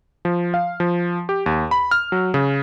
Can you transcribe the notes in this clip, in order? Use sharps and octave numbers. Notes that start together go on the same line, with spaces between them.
F3
F5
F3
G4
D#2
B5
F6
F#3
C#3